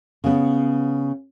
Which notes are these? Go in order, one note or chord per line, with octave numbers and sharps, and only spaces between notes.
C#3 B3